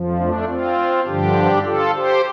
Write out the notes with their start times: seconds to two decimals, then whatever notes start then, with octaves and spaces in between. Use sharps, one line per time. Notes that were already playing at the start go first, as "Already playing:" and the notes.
Already playing: F2 F3
0.18 A3 D4
0.47 C4 F4
1.06 G2 D3 F3 D4 G4
1.64 F4 A4
1.95 G4 C5